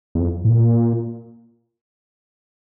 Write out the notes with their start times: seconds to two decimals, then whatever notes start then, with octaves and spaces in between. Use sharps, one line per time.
0.15 E2
0.20 F2
0.45 A2
0.49 A#2